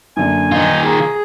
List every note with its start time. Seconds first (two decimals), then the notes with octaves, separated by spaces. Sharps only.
0.17 F#2 D3 A#3 G#5
0.52 D#3 D#4 F4
0.86 G#4 A#5